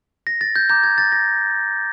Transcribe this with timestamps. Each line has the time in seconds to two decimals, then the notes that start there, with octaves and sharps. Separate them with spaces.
0.27 A#6
0.41 A6
0.56 G6
0.69 A#5 D6 F#6 G6
0.83 G#6
0.98 A6
1.12 A#6